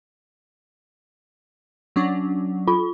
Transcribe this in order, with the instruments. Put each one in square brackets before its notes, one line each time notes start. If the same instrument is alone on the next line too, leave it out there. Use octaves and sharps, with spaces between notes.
[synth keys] F#3 C#4 D4
[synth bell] F4 B5